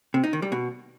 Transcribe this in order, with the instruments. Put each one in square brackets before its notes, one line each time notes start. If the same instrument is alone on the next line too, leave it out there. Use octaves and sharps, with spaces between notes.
[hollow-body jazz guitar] C3
D#4
D#3
G3
B2